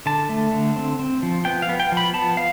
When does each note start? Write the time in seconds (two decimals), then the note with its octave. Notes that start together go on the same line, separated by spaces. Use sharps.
0.06 D3 A5
0.29 A3
0.52 D3
0.76 C4
0.99 C4
1.23 F3
1.45 B3 G5
1.62 F5
1.69 B3
1.80 G5
1.92 F3
1.97 B5
2.14 B3 A5
2.37 F5